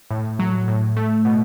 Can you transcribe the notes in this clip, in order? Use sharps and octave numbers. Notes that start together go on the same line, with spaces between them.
A2
F#3
A2
A3
B2